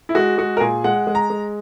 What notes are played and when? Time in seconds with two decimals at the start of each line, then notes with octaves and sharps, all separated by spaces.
0.09 E4
0.15 G#3 F#4
0.38 G#3 F#4
0.57 A#4
0.60 A#2 G#4
0.84 G#3 F#5
1.07 G#3
1.15 A#5
1.30 G#3